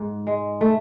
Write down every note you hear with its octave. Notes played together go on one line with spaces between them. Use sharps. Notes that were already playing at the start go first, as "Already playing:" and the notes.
Already playing: G#2
G#3
A3